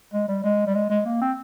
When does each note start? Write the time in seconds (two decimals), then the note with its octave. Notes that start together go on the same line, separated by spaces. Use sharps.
0.14 G#3
0.28 G3
0.44 G#3
0.67 G3
0.75 G#3
0.90 G#3
1.06 A#3
1.21 C4